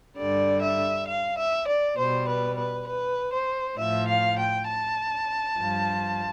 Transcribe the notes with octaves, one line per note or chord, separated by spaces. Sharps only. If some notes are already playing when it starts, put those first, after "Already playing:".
G2 D3 G3 D5
E5
F5
E5
D5
B2 G3 C5
B4
B4
B4
C5
A2 F3 E5
F5
G5
A5
G2 F3